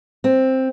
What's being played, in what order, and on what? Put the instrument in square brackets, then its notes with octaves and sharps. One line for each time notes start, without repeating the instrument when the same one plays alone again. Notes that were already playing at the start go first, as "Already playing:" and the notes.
[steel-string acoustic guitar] C4